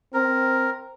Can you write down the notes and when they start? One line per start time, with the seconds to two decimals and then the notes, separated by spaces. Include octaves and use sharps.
0.14 C4 A#4